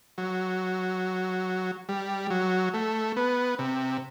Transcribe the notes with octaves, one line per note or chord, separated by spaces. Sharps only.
F#3
G3
F#3
A3
B3
C3